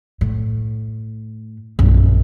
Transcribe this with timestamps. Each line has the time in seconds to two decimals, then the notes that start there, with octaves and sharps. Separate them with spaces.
0.21 A2
1.79 A#1 F#2